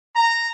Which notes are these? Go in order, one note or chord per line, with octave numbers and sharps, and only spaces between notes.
A#5